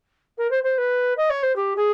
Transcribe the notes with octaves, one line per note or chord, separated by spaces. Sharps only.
A#4
C5
C5
B4
D#5
C#5
C5
G4
G#4